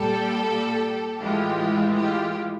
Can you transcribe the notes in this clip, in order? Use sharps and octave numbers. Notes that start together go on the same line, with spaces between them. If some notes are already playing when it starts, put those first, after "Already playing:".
Already playing: A#2 G3 G4 A4
A2 E3 G#3 F4 G4
F4 G4